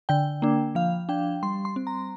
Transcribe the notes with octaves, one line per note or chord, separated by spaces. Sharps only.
D3 G5
A#3 D4
F3 F5
D4 G5
G3 C6
C6
C4
A#5